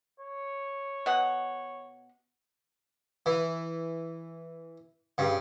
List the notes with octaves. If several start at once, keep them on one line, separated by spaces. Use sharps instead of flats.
C#5
B2 D#5 F#5
E3
G2 C#3